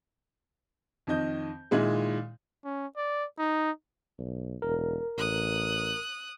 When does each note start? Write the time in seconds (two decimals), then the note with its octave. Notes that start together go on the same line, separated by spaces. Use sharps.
1.07 F2 D#3 D#5 G6
1.71 A#2 D#3 G#3 E4 G#4
2.65 C#4
2.97 D5
3.39 D#4
4.19 B1
4.62 E1 A#4
5.18 A1 D#6 F#6